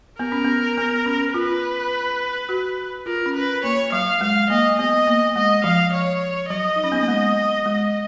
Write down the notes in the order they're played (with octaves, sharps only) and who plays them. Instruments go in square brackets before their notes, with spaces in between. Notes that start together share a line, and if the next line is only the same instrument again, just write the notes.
[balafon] B3 [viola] A#4
[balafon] C#4
B3
B3
C#4
[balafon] F4 [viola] B4
[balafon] F#4
[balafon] F4 [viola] A#4
[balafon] C#4
[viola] B4
[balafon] A#3 [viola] C#5
[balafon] F#3 [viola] F5
[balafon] G#3 [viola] F5
[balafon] A#3 [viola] D#5
[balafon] B3 [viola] D#5
[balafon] A#3
[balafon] G#3 [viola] D#5
[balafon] F3 [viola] F5
[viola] C#5
[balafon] F#3 [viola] D#5
[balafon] D#4
C#4
B3
A#3
G#3
G#3